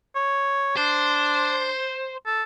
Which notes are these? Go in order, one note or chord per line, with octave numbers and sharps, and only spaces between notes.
C#5
D4 C5
A4